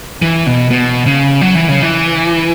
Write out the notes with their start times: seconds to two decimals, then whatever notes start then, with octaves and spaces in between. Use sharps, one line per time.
0.22 E3
0.47 B2
0.70 B2
1.06 C#3
1.41 F#3
1.55 E3
1.69 C#3
1.82 E3